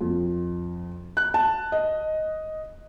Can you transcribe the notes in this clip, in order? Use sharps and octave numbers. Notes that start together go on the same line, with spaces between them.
F2
F#6
A5
D#5